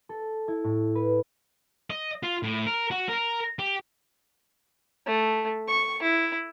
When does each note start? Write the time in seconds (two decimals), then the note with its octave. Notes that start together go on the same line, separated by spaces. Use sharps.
0.09 A4
0.48 E4
0.64 A2
0.95 B4
1.90 D#5
2.23 F4
2.43 A2
2.66 A#4
2.91 F#4
3.08 A#4
3.59 G4
5.07 A3
5.68 C#6
6.03 E4